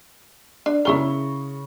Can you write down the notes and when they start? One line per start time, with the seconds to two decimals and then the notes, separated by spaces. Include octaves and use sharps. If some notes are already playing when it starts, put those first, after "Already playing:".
0.66 D4
0.85 C#3 E4 G#4 A#4 C#6 G7